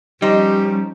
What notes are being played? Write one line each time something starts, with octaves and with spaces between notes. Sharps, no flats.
F3 G3 C#4 D#4 G4 C5